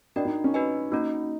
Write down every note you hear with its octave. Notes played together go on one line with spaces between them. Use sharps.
D4 F#4 A#4 D#5 G5
D#4
C#4
F#4 B4 D#5 G#5
A#3 C#4 D#4 F#4